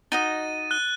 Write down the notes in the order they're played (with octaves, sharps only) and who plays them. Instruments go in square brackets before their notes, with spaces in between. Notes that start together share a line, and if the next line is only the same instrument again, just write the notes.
[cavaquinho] D#4 F#4 D#5 [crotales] A6 D#7
[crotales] F#6 G7